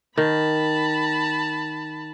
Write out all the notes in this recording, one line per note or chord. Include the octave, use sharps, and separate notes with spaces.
D#3 A5 B5